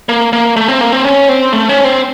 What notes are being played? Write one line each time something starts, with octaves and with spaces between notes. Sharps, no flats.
A#3
A#3
A3
C4
A#3
C4
C#4
C4
A3
C#4
C4